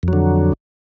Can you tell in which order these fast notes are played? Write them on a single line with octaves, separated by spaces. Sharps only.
F2 F#3 D3